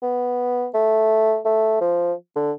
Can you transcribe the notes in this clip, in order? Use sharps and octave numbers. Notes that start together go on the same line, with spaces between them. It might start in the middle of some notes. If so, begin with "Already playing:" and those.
B3
A3
A3
F3
D3